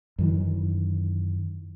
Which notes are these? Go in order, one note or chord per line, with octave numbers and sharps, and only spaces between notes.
F#2 D#3 E3